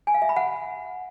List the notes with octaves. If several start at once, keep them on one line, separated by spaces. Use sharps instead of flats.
G#5
F5
E5
B5
F#5